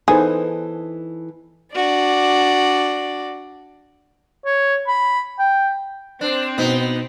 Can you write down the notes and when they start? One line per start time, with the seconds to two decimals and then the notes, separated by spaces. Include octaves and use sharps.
0.08 E3 B3 D#4 G#4 A4 B4 C5
1.75 D4 F#4 D5
4.45 C#5
4.88 B5
5.39 G5
6.21 C4 D4
6.58 B2 B3 D#4